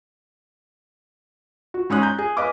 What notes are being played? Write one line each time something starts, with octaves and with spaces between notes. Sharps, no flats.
F#4
G#2 C#4 C#5 D#6 F#6
A#5 G6
G#4
B4 D#5 F5 G#5 D6